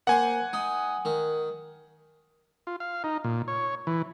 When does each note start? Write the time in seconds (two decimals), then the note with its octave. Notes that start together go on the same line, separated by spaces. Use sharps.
0.07 A#3 C5 F#5 G#5
0.53 D#4
1.05 D#3
2.67 F4
2.80 F5
3.04 D#4
3.24 A#2
3.48 C#5
3.87 E3